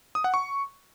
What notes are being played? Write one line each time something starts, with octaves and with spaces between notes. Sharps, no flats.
D#6
F#5
C#6